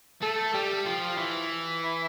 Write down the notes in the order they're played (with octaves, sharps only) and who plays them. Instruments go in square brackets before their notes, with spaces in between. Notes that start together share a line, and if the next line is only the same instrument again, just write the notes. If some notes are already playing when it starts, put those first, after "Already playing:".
[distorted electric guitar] A3 [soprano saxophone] A4
[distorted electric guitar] G3 [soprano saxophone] G4
[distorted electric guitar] F3 [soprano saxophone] F4
[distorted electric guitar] E3 [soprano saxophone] E4